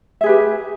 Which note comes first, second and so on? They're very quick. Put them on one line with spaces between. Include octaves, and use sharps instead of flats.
E5 G#4 B4 G4